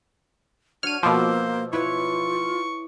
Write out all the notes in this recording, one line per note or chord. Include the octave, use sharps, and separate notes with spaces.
D4 F#4 C#5 F6 D#7
B2 F3 A#3 C5 D6 E6
E4 F4 B4 C#5 C#6